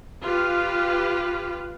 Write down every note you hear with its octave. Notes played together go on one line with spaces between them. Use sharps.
F4 G4 B4